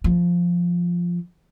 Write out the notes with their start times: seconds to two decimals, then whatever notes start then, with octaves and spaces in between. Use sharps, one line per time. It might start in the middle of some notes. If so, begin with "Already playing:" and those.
0.04 F3